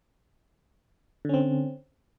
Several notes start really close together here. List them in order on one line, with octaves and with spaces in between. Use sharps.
D3 C#4 C4